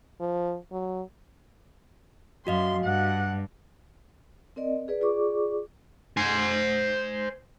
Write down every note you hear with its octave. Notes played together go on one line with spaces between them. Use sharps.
F3
F#3
F#2 F#4 D#5 F5 C6
G2 F#5
C4 A#4 D5 D#5
G#4 B4 D5
F4 G#4 D5 C#6 D6
C5 G#5